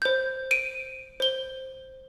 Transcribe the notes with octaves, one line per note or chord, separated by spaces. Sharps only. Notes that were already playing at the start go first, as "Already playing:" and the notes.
C5 G6
D7 D#7
C5 G7